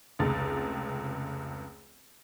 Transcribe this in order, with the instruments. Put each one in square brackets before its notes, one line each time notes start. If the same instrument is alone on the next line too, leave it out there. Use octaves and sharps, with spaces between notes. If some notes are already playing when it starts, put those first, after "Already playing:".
[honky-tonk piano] F1 C#2 A6